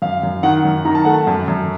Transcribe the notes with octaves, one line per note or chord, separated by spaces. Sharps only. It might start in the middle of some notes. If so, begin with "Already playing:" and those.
F#2 F5
F#2
D#3 F#5
F#2
D#3 A#5
A5
A3 F#5
A5
F#2
F#2